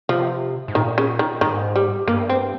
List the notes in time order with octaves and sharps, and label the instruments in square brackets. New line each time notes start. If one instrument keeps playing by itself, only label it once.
[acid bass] C3 [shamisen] F3
[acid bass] G#2
[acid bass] A#2 [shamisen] D#3
[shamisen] C#3
D#3
[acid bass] G#2 [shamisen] D#3
[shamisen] G3
[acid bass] G2 [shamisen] A#3
[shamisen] C4